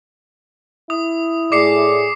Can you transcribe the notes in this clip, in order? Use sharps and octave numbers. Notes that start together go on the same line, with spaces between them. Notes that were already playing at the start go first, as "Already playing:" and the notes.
E4 D#6
A2 G#4 D5 D6 C7 C#7